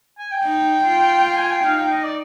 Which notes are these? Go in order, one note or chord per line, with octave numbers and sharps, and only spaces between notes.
G#5
G5
D#4
F4
G5
G#5
G5
D#4 F5
G5
D#5
D5